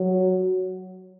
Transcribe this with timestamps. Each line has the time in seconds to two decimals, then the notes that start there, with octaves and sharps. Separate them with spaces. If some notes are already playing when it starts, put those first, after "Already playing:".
Already playing: F#3